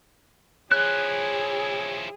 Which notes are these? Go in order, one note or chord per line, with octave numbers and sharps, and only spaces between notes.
F3 E4 G#4 C#5 F#6